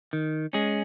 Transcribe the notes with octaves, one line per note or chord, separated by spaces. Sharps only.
D#3
G#3 C#4 G#4